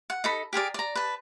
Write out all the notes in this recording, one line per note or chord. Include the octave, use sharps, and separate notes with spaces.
F#5
D#4 A4 B5
G4 G#4 A#4 D5
D5 A#5
B4 A5